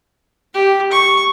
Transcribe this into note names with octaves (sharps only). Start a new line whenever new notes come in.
G4
C#6